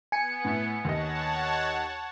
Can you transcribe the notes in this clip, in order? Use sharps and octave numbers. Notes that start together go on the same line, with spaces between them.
B3 G#5 C#7
A2
D#2 C#5 D#5 F#5 A5